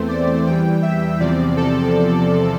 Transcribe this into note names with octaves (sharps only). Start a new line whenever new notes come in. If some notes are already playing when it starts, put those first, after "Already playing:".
Already playing: E2 E3 A3 C4 C5
D5
E2 E3 G3 G5
E5
E2 C3 F3 C4 D5
A4